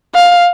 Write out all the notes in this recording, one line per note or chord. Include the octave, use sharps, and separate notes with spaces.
F5